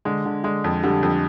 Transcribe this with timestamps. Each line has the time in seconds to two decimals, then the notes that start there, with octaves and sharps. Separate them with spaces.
0.05 D3 G#3
0.25 D3
0.44 D3 G#3
0.64 F2
0.83 D3 G3
1.03 F2